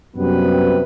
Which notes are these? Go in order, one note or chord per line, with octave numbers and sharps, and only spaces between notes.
F#2 C3 G3 B3 B4